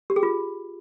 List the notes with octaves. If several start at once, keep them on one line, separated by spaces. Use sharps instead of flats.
G4
G#4
F4